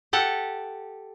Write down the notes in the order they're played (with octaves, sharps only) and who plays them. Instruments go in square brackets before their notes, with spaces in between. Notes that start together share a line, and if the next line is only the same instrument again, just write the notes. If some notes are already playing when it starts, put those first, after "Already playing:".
[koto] G4 A4 F#5